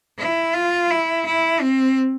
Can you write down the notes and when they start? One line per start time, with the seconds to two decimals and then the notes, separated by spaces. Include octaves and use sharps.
0.19 E4
0.54 F4
0.91 E4
1.26 E4
1.61 C4